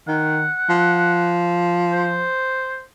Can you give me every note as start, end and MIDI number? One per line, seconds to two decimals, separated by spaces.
0.08 0.49 51
0.08 1.44 78
0.69 2.28 53
1.93 2.82 72